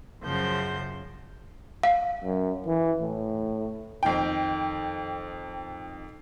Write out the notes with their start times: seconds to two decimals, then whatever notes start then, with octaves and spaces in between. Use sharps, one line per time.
0.23 F#2 C#3 F3 C5 G6
1.83 F5
2.24 F#2
2.66 E3
3.02 A2
4.03 F2 D#3 G5